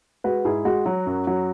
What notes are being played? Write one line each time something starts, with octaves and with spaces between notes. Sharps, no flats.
G#3 F#4 B4
G#2 E4 G#4
G#3 F#4
F#3
F#2
F#3